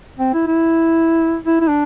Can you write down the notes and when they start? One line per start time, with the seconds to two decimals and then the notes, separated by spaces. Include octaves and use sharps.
0.19 C4
0.34 E4
0.47 E4
1.46 E4
1.61 E4
1.68 D4